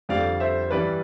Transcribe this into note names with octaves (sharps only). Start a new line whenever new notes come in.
F2 D3 G3 D5 F5
C5 E5
G2 E3 G3 B4 D5